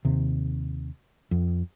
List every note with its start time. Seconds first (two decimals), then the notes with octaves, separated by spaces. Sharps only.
0.05 D#2 C3
1.31 F2